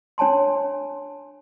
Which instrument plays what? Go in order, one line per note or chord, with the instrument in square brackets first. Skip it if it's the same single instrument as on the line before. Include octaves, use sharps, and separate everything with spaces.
[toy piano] D4 C#5 G#5 A5 C6